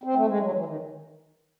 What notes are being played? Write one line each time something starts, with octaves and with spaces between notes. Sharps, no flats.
C4
A3
G#3
F#3
E3
D#3